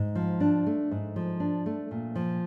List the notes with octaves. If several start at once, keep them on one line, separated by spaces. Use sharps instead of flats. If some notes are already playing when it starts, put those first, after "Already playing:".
Already playing: G#2
F3
D4
A3
G#2
F3
D4
A3
A#2
F3